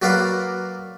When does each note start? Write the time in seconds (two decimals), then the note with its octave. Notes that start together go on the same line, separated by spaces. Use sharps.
0.02 F#3 A#3 F#4 B4 D5 F5